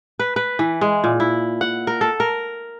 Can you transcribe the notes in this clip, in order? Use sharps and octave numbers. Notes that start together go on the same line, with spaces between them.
B4
B4
E3
G#3
A#2
E4
F#5
A#4
A4
A#4